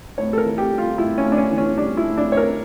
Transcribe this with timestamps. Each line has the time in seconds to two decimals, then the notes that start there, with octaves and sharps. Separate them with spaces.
0.18 A2 C#5
0.33 A4
0.38 A#4
0.45 E3
0.58 G4
0.72 G3
0.78 F4
0.98 A2 E4
1.18 C#4
1.25 A2
1.32 D4
1.38 C#4
1.51 E3
1.58 C#4
1.78 G3 D4
1.97 E4
2.04 A2
2.17 D4
2.31 A2 C#5
2.37 A#4